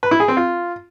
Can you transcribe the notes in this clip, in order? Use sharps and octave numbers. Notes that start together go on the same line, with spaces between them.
B4
E4
G#4
C4
F4